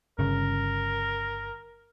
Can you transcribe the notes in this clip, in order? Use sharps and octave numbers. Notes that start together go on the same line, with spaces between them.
G1 C#3 A#4